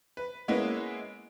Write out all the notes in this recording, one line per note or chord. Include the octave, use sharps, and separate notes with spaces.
B4
G#3 A#3 B3 C#4 E4 B4